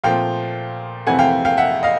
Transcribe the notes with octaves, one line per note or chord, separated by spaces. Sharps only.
A#2 F3 A3 C4 F5 G5
F2 C3 E3 A3 C4 F#5 G#5
F5 G5
F5 G5
E5 F#5
D#5 F5